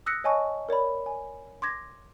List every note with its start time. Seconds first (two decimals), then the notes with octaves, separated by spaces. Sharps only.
0.06 D#6 E6 F#6 A#6 B6 C#7
0.24 C#5 D#5 G#5 A5 C#6
0.69 A#4 C#5 D5 B5
1.06 G#5
1.62 C6 D6 G#6 A#6